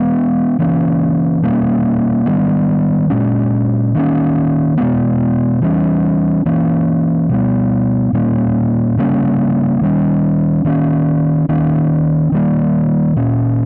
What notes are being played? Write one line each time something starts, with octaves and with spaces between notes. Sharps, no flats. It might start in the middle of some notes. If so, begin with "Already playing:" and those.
Already playing: E3 G#3 B3
C#3 E3 A#3 C#4
B2 G3 A#3 C#4
D#3 G3 B3
A#2 G#3 C#4
D#3 A#3 C#4
B2 G#3 B3
E3 G3 C#4
E3 A#3 C#4
B2 G3 B3
A#2 G3 A#3 C#4
C#3 G3 A#3 C#4
D#3 G3 C#4
D#3 A#3 C#4
D#3 A#3 C#4
D#3 G3 A#3
A#2 A#3 C#4